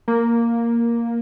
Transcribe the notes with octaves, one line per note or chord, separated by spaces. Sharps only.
A#3